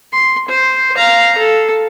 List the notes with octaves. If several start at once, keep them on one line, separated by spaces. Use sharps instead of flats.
C6
C5
F5 A#5
A4